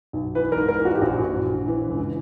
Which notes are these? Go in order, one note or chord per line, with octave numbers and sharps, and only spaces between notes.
B1
E3 B4
A#4
G#2
A#4
E3
F#4
G4
A#1 F#4
A#1
A#1
E3
C#2